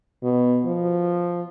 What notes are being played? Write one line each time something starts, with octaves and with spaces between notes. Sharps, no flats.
B2
F3